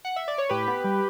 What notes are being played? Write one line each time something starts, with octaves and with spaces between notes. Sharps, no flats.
F#5
E5
D5
C#5
A2 G4 B4
B3
G3